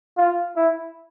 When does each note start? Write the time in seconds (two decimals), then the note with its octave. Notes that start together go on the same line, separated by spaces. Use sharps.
0.18 F4
0.56 E4